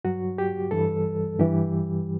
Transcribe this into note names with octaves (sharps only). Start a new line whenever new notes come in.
G2 F#3 F#4
G4
G2 E3 G3 A4
G2 E3 G3 G4